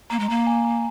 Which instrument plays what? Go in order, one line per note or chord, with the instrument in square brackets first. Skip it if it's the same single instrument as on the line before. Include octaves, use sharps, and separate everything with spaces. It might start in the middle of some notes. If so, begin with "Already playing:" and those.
[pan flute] A#3 [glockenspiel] A#5
[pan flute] G#3
[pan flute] A#3 [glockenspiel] A#5
[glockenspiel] G#5
A#5